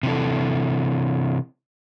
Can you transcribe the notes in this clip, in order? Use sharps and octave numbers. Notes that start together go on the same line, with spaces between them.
C3 E3 A4